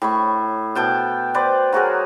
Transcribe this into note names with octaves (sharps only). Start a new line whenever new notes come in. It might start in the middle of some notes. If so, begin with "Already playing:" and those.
A2 B5 C#6
B2 G5 A5
B4 C5 D5
F#3 F#4 G#4 A#4